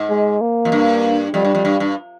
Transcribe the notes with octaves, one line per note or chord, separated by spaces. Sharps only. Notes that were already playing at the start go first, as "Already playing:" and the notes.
Already playing: G#2
G#3
A#3
F2
G2
F2 G3
G2
F2
G2
G2